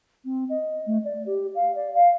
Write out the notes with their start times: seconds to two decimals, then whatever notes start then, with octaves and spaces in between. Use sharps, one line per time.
0.25 C4
0.49 D#5
0.86 A3
1.04 D5
1.26 G4
1.55 F5
1.75 D5
1.94 F5